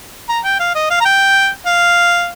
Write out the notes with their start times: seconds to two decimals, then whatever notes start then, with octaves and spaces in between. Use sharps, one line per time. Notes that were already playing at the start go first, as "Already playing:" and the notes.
0.29 A#5
0.44 G5
0.60 F5
0.75 D#5
0.90 F5
1.00 A#5
1.05 G5
1.66 F5